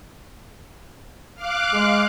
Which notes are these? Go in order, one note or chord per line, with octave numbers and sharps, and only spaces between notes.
F5 D6 F#6
G#3